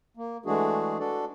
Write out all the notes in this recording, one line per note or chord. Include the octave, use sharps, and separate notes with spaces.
A#3
E3 G#3 A3 D4 F#4 G#4
D4 F#4 A4 D5